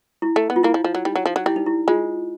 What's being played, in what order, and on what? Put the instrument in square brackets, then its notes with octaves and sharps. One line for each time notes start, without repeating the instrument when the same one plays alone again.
[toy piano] E4
[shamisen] A3
B3
[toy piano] F4
[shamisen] A#3 [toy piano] E4
[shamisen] F3
F3
F#3
[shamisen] G3 [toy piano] D#4
[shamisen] F#3
F3
F#3
[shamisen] G3 [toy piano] E4
[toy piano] D#4
E4
[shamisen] G#3 [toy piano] F4